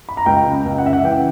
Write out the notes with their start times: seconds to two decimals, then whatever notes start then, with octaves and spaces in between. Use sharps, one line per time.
0.09 B5
0.17 A#5
0.26 C#2 G5
0.46 C#3
0.65 C#2
0.78 F#5
0.85 C#3 E5
0.93 F#5
1.04 E3 G5